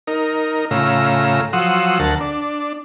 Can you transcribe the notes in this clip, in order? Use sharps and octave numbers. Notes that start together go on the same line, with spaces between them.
D#4 A#4
A2 C#3 F4 A#5 E6
F3 F#3 F#5 C6 D#6 E6
D2 A#4 F#5 A5
D4